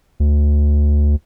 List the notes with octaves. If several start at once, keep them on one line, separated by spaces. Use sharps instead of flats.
D2